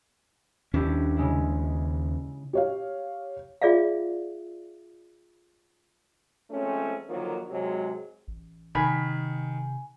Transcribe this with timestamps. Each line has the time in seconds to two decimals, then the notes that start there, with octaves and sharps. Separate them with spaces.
0.73 D#2 C#4 D4 E4 G4
1.17 C#3 G#3 E4
2.53 G4 C#5 F5
3.62 F4 G#4 D5 E5 F5
6.50 F3 G#3 A3 C4 C#4
7.08 D3 D#3 F3 F#3 A#3
7.50 G#2 C3 F#3 G#3
8.28 A1
8.75 C3 D#3 G#5 B5